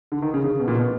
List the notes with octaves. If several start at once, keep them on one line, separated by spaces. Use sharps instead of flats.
D3
D#3
C#3
C#3
B2
A#2
B2